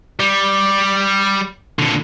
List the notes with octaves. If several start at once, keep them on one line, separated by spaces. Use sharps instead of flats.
G3
A#2 D3